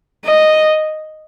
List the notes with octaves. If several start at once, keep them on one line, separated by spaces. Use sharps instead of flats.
D#5